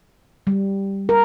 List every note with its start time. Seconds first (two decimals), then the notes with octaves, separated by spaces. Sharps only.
0.47 G3
1.09 A#4